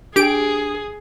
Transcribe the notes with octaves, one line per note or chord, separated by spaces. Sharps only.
D4 G4 G#4 D7